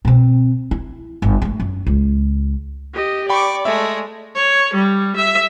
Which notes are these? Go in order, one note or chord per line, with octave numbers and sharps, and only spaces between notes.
B2 C4
E4
G1
G3 A3
F#2
C#2
G4 D#5
D5 G5 B5 C#6 D6
G#3 A3 E5
C#5
G3
E5